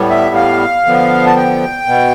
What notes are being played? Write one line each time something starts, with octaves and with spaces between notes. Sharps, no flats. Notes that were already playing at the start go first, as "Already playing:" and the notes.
Already playing: A2 G3 B3
E5
F5
D3 F3 B3
A5
G5
B2 B3